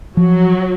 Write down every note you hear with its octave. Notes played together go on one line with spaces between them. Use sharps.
F3 F#3